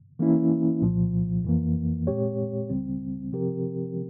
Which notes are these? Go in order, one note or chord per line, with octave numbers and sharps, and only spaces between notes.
E3 A#3 C#4 E4
C2 A#2 F3
F2 E3 A#3
A#2 G#3 C4 G4 C#5
C#2 C#3 G3 C4
C3 F3 C4 G4 A#4